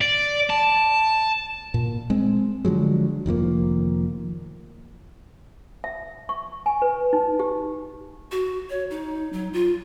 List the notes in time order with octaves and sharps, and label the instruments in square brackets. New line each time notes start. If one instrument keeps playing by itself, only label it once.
[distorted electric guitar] D5
A5
[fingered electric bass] A#2
G#3 C4
D3 F3 F#3 G#3
F1 D#3 F3 A#3
[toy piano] E5
C#6
G#5
B4
D#4
G4
[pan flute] F#4
C#5
D#4
F#3
F4